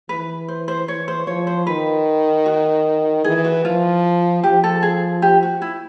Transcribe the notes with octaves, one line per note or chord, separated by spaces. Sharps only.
E3 B4
C5
C5
E3 C#5
C5
F3 C#5
C5
D#3 B4
F#4
E3 G#4
F#4
F3 F4
F3 G4
A4
G#4
G4
F#4
E4